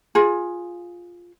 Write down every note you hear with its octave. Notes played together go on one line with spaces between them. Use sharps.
F4 G#4